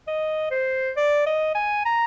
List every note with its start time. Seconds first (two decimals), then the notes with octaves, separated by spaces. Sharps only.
0.07 D#5
0.51 C5
0.97 D5
1.26 D#5
1.55 G#5
1.86 A#5